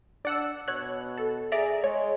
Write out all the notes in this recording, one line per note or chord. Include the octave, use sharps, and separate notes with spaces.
D4 D5 F#5 E6
B2 C#5 F#6
A4
G#4 D5 E5 A#5
G#3 C#5